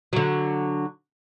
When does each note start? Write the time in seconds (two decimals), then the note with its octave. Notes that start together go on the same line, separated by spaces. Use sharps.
0.13 D3 F#3